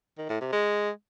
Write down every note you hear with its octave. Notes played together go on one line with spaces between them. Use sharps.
D#3
A2
C3
G#3